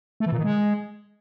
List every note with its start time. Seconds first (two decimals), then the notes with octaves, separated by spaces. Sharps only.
0.20 A3
0.26 E3
0.32 A#2
0.38 D#3
0.44 G#3